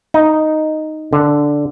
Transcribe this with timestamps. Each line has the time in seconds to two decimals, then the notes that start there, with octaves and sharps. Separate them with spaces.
0.14 D#4
1.13 D3